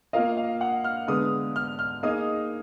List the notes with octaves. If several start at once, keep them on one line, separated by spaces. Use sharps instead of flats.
A#3 F4 A#4 D#5 F5
F5
F#5
F6
D3 G#3 B3 D#6
F6
F6
A#3 D#4 G#4 D#5 D#6